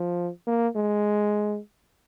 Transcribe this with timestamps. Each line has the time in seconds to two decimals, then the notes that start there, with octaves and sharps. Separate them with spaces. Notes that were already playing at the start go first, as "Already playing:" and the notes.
Already playing: F3
0.47 A#3
0.76 G#3